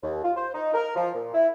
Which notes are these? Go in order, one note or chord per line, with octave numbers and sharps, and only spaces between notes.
D#2
F4
C5
D#4
A#4
F3
A#2
E4